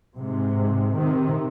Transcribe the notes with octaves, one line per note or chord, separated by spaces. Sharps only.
G#2 C3
C3 D#3